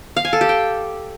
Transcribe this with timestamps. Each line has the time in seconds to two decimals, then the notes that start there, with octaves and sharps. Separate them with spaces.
0.17 F5
0.25 G#5
0.33 A4
0.41 G4
0.49 G5